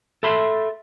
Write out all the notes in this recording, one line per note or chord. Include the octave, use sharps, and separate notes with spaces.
A4 E5 B5 C6